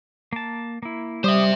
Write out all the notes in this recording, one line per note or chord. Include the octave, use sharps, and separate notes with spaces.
A#3 A5
A#3 E4
G3 G4 C5 E5 D#6